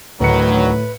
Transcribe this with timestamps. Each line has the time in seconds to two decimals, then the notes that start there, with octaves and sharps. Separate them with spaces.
0.20 D2 A2 D#3 F#3 B4 C#7